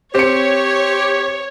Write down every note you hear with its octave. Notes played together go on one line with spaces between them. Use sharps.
C4 G4 C#5 C#7